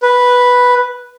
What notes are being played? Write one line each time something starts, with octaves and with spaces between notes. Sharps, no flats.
B4